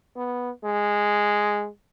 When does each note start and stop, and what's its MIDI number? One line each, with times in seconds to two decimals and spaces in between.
0.16 0.50 59
0.64 1.68 56